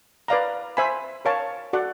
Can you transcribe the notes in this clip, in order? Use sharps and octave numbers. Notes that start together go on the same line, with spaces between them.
B4 D5 F5 A#5
C5 E5 G#5 B5
A#4 C#5 F5 A5 C#6
F#4 A4 D5 F#5